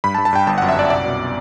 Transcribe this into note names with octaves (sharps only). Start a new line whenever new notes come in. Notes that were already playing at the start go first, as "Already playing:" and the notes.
G2 B5
A5
G2
A5
G2 G5
G1 A5
F#5
F#2
E5
F#2 D5
C2 D5
B2